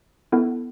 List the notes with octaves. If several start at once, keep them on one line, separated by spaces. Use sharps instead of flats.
B3 E4 A4